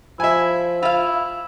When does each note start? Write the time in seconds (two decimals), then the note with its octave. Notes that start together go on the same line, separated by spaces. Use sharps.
0.20 F3 E4 E5 G#5
0.83 E4 F4 F5